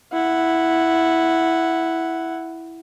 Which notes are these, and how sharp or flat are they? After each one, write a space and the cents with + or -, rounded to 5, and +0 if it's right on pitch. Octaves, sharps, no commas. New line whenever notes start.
E4 +0 F#5 +0